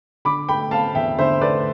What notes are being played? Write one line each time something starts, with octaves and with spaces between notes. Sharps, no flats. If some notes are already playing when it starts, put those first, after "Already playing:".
D3 B5 D6
A3 G5 B5
C4 F5 A5
E2 E5 G5
D3 C5 E5
A3 B4 D5